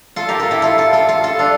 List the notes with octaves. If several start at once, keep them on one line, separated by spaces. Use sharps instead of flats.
F4 A4
G4 A#4
F4 A4
E4 G4
F4 A4
F4 A4
F4 A4
F4 A4
F4 A4
D4 F4